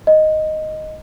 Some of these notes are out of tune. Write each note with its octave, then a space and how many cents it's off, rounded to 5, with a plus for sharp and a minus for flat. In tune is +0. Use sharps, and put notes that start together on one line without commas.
D#5 +0